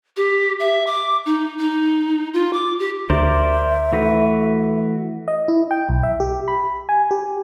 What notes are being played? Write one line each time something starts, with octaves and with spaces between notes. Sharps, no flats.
G4
E5
D6
D#4
D#4
F4
D6
G4
D2 A#4 C5 D5 E5
E3 A3 F#4 B4
D#5
E4
G5
B1
E5
G4
B5
G#5
G4